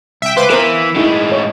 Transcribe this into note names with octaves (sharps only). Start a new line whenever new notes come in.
C2 E5 G5
C#2 B4 C5 F5 C6 D6
E3 B3 A#4 C5 E5 F5 A#5 B5
A2 G#3 D#4 E4 G#4 C#6
C#5